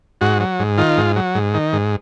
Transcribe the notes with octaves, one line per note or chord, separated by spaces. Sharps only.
G#2 F#4
F#3
G#2
D#3 F4
G#2
F#3
G#2
D#3
G#2